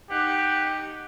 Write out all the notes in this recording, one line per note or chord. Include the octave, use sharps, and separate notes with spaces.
D#4 G4 F#5